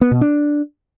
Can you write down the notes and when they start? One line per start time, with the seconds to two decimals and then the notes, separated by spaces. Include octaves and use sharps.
0.01 B3
0.11 B2
0.21 D4